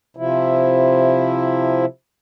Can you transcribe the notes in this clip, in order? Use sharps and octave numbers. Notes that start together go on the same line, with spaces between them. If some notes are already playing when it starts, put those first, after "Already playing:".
C3 F3 E4